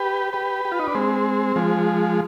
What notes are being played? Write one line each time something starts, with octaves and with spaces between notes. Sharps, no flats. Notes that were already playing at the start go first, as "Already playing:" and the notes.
Already playing: G4 B4
G4 B4
G4
F4
D#4
D4
G#3 C4
F3 G#3